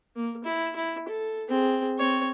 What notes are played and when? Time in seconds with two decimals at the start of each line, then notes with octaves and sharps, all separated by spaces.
0.16 A#3
0.45 E4
0.76 E4
1.08 A4
1.49 C4 G#4
1.98 C4 C#5